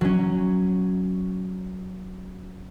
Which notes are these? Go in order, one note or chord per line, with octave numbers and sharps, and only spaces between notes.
F#3 C#4